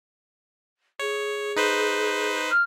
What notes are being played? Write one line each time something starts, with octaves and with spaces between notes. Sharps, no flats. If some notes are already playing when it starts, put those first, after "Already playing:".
G#4 C#5
D#4 B4 C5
F6